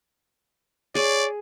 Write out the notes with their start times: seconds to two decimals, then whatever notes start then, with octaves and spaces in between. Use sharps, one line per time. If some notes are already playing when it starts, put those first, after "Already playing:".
0.95 G#4 C#5 D5